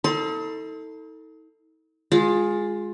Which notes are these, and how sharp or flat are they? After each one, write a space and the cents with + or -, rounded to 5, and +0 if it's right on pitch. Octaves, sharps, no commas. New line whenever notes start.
D#4 +45 A4 +20 C6 +0
G#3 +0 F4 +20